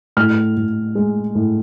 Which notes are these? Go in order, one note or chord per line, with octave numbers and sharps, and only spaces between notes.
A2 F6
A2
G#3
A2